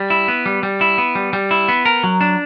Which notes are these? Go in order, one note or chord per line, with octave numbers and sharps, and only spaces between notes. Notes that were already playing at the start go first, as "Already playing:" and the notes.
Already playing: G3
E4
B3
G3
G3
E4
B3
G3
G3
E4
B3
A#4
F#3
D4